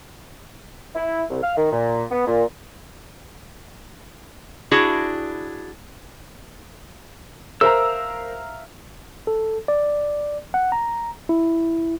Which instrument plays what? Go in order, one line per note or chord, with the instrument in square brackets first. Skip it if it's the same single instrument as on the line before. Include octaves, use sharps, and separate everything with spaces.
[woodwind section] E4
C2
F5
D#3
A#2
B3
A#2
[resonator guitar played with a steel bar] D4 E4 F#4 G#4
[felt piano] A#4 C5 [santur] E5 F5 A#5 [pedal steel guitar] E6
[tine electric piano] A4
D5
F#5
A#5
E4